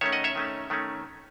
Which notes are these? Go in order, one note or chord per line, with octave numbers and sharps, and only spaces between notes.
D#3 A3 C#4 C#5 E5
D#5 F#5
C#5 E5
D#3 A3 C#4
D#3 A3 C#4